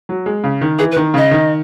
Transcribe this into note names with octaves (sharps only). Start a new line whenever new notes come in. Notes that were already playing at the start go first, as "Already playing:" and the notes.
F#3
G#3
C#3
D#3
E3 G#4
B4
D#3
C#3 D#5
D#3